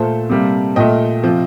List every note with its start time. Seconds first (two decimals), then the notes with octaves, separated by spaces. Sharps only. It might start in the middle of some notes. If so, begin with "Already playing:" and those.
Already playing: A#2 A3 A4 C5
0.30 C3 G3 A#3
0.76 A#2 A3 D#5 G5
1.24 C3 F3